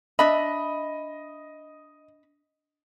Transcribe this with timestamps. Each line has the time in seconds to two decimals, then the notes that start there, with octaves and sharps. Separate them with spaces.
0.19 D4 D#5 E5 B5